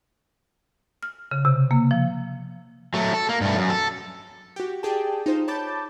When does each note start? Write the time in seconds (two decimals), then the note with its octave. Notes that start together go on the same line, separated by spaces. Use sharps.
1.03 F6
1.31 C#3
1.45 C3
1.71 A#3
1.91 F3
2.94 F#3 A3
3.14 A4
3.29 A#3
3.41 G2 A3
3.58 F#2
3.70 A4
4.56 F#4 G4
4.83 G4 G#4 D5 G5 A5
5.26 D#4 F4 C5
5.48 C#5 A5 B5 D6 G6 A6